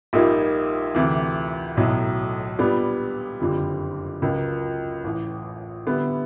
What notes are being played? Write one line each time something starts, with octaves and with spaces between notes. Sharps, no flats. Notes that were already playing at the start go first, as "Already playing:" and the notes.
A#1 A#2 G3 A#3 D#4
D2 C3 E3
B1 A2 F#3
A#2 G3 B3 D4
F#1 F2 D3 G3 C4
C#2 C#3 F#3 A#3
A1 A2 E3
D3 G3 B3 E4